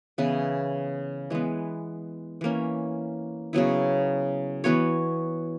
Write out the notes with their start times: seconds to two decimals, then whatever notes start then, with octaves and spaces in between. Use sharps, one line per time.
0.18 C#3 E3 B3 E4
1.30 E3 G#3 B3
2.41 E3 A#3 C#4
3.53 C#3 F#3 B3 E4
4.64 E3 B3 F#4 C#5